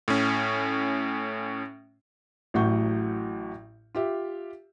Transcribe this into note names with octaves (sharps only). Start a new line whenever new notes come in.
A2 C#4
A1 A2 F#3 F#5 C#6 G6
F4 G4 E5